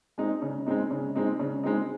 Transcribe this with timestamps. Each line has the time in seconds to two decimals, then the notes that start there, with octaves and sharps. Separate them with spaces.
0.18 G#3 C4 D#4
0.42 C#3
0.66 G#3 C4 D#4
0.91 C#3
1.15 G#3 C4 D#4
1.39 C#3
1.63 G#3 C4 D#4